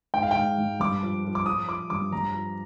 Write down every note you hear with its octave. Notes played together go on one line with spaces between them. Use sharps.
G#2 G5
F5
G5
G#2
G#2
G2 D6
F3
F3
D6
F3 D#6
F3 D6
G2 D6
G2 A#5
F3